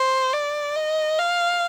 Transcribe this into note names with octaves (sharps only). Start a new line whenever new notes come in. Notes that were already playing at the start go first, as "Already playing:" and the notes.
Already playing: C5
D5
D#5
F5